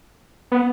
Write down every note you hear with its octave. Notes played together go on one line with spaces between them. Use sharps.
B3